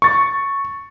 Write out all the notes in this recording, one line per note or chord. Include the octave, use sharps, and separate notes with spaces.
C#6 A6